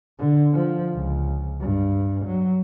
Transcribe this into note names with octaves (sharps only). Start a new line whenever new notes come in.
D3
F3
C#2
G2
F#3